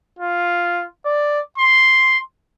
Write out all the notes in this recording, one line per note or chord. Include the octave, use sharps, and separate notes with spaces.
F4
D5
C6